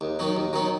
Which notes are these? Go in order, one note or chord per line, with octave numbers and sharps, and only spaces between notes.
D#2
D#3 F#3 B3 D#4
D#2
D#3 F#3 B3 D#4